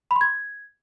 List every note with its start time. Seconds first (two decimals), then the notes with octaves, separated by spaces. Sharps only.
0.11 B5
0.16 C6
0.21 G#6